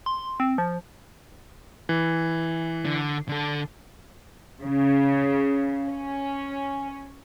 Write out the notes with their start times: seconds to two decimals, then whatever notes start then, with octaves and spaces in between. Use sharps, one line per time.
0.06 C6
0.40 C4
0.58 F3
1.89 E3
2.85 D3
3.29 D3 A4
4.62 C#3
5.89 C#4